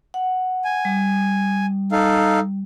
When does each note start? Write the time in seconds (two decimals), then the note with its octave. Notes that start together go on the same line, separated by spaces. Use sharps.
0.14 F#5
0.65 G#5
0.85 G3
1.92 D#4 A4 F5